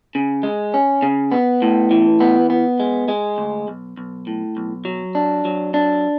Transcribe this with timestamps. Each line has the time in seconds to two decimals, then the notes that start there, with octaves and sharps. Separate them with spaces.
0.15 C#3
0.43 G#3
0.74 C#4
1.02 C#3
1.32 B3
1.62 A2
1.91 E3
2.20 B3
2.50 B3
2.80 G#3
3.08 G#3
3.38 D2
3.68 B1
3.97 B1
4.27 A2
4.57 B1
4.85 F#3
5.15 D4
5.45 F#3
5.74 D4